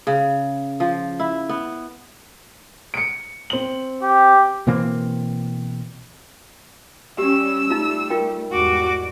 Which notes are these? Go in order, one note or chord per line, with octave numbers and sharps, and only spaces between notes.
C#3
F3
E4
B3
C#7 D7
C4 F#7
G4
B2 E3 A#3 C4
G3 C#4 G4 E6
G3 A3 D#4 F4
F4 A#4 G5
E2 G#2 G3 F#4 D6